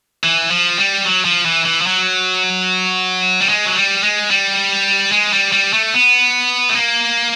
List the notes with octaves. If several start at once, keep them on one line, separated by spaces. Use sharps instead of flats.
E3
F3
G3
F#3
F3
E3
E3
F3
F#3
G3
G#3
F#3
G3
G#3
G3
G#3
G3
G3
A3
B3
A3
A#3